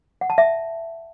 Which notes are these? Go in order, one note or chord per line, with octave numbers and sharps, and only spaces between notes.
F#5
A5
E5